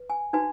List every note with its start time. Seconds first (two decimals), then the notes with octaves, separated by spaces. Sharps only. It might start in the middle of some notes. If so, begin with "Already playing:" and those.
Already playing: B4
0.10 G#5
0.33 D#4 F#4 B4 G#5